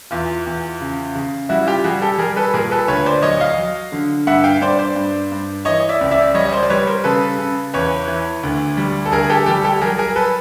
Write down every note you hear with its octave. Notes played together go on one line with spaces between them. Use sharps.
E2 F4
E2
C#3
C#3
G3 E4 F#4
F4 G4
G3 F#4 G#4
G4 A4
G3 G#4 A#4
A4 B4
A#2 G#4 A#4
A4 B4
D2 B4 C#5
C5 D5
F#3 C#5 D#5
D#5 F5
F#3
D3
G2 E5 F#5
F5 G5
G2 C5 D5
C5 D5
G2
G2
E3 C#5 D#5
D5 E5
C#2
D5 E5
G3 C#5 D#5
D#5
C5 D5
D5
G3 B4 C#5
A#4 C5
C#3 A4 B4
C#3
E2 B4 C#5
E3
D2
G3
A4
D2 G#4 A#4
G#4
G4 A4
G3 G4 A4
G4 A4
F#3 G#4 A#4
G#4 A#4
A4 B4